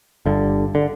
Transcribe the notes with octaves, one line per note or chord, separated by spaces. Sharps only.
G1 G2 D3
D3